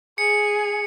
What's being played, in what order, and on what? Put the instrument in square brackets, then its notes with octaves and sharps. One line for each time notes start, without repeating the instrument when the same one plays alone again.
[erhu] G#4 [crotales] C#7